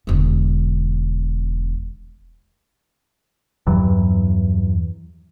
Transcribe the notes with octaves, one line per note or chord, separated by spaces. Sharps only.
E1 D3
E2 G2 E3 F#3